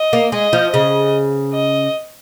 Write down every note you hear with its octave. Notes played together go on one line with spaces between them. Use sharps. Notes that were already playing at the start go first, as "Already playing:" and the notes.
Already playing: D#5
A#3
G#3 D#5
F3
C#3 D#5
D#5